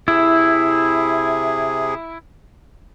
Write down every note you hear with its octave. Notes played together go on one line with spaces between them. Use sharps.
C3 E4 G#4